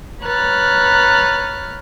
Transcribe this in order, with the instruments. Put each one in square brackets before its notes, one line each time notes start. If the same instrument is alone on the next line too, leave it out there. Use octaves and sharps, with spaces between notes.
[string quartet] B4 C#5 A#5 F6 F#6 A6